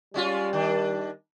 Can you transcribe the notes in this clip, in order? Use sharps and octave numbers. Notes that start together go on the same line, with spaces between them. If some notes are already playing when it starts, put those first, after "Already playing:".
G3 G#3 C#4 F4
D#3 D4